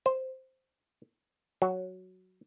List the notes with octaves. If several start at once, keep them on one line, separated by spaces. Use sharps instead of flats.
C5
F#3